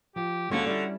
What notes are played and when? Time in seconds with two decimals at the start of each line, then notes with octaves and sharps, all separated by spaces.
0.16 F3 G4
0.51 D#2 D3 G#3 C#4 F4 F#4 G#4 F#5
0.67 G3 C#4 E4 F#4 D5